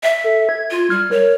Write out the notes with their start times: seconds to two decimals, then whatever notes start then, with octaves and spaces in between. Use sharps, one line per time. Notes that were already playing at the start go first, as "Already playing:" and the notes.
0.03 E5
0.24 A4
0.49 G#6
0.71 F4
0.90 G3 F6
1.11 A#4 C#5